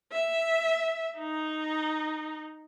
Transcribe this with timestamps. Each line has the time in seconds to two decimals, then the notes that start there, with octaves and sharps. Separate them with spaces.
0.12 E5
1.17 D#4